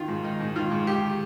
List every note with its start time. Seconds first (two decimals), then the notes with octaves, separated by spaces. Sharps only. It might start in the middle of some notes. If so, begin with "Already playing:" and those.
Already playing: D#3 F4
0.08 G#2
0.24 D#3 D#4
0.40 G#2
0.56 D#3 F4
0.71 G#2
0.86 D#3 G4